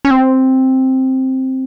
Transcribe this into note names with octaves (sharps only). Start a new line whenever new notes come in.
C#4
C4